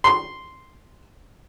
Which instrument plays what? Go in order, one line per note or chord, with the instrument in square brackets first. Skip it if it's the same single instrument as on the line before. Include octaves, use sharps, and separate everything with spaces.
[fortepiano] C6